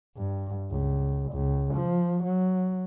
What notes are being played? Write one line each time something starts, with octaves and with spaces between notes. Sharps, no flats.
G2
C#2
C#2
F3
F#3